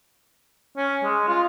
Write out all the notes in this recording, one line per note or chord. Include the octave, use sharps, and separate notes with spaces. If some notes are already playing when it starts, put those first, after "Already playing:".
C#4
G#3
F4